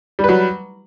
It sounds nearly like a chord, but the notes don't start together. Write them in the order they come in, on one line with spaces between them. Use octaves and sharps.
G3 B4 F#3